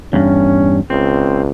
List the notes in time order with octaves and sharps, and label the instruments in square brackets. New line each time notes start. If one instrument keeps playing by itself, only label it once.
[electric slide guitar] E2 G2 [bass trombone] C#4
[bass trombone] C#2 [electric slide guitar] C4